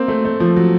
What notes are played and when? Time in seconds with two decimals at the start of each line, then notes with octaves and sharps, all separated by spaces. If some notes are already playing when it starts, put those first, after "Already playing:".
Already playing: A#3 C4
0.08 A3
0.25 A3
0.40 F3
0.56 F#3